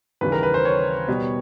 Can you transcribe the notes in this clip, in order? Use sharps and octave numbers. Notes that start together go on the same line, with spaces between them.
D#2 C#3 E3 G3 B4
A#4
B4
C5
C#5
B2 G3 B3